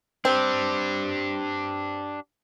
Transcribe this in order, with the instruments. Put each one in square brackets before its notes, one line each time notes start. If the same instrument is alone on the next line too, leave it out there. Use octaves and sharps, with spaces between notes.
[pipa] C4 [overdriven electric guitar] D4 G4